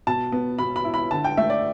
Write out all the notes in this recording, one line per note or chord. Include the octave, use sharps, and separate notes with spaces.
B2 A5
B3
B2 B5
B5
E4
B5
D3 A5
G5
A3 E5
D5